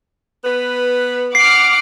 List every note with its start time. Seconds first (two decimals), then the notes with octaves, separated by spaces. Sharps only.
0.45 B3 B4
1.35 F#5 D6 F6 C7